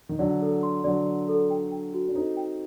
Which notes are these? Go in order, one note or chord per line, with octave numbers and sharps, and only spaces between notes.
D#3
D3 F#3 D5
A4
C6
D3 F#3 D5
D5
A4
G5
G5
F#4
D4
C4 D#4 A4
G5